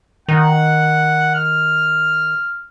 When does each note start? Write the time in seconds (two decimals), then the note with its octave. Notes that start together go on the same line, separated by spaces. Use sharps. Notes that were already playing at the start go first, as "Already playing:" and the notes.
0.29 D#3 F#5
1.35 F6